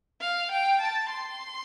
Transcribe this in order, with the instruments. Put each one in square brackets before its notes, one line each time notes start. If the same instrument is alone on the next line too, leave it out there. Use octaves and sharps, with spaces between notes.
[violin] F5
G5
A5
C6